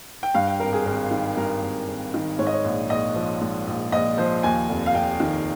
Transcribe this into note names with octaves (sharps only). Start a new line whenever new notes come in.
G5
G2 F5
G5
G#1 A#4
G#4
G#1 A#4
D#3
G2 A#4
G#1
G#1
D#3
G#2 C#5
D#5
C#5
A#1
A#1 D#5
F3
G#2
A#1
A#1 D#5
F3 C5
D#2 G#5
F1
F5
F1 G5
D#3